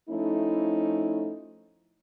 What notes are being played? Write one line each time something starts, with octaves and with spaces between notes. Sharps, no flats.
F3 A3 C#4 D#4 E4